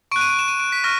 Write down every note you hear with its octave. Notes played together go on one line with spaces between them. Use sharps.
C#6 F#6 D7
D#7
D7
E7
D#7
D7
B6
C#6 F6 A#6